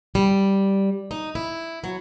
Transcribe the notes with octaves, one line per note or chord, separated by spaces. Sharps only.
G3
D#4
E4
F#3